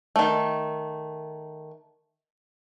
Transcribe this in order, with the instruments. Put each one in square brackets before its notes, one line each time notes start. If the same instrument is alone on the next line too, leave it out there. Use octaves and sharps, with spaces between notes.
[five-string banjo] D#3 A3